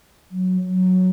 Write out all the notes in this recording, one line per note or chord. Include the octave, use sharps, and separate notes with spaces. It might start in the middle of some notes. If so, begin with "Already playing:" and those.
F#3
F#3